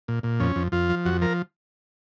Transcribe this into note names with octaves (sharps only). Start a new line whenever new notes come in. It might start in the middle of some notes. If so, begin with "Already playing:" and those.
A#2
A#2
F2 C#4
F2
F2 F4
F3
F2 F#4
F3 A#4